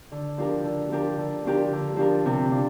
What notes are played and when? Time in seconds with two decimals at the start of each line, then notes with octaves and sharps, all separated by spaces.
0.12 D3
0.38 F3 D4 G4 A#4
0.65 D3
0.91 F3 D4 G4 A#4
1.19 D3
1.45 F3 D4 G4 A#4
1.72 D3
1.96 F3 D4 G4 A#4
2.26 C3
2.51 F3 D4